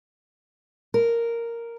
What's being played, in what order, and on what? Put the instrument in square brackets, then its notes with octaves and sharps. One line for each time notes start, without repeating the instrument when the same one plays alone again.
[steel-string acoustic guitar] A#4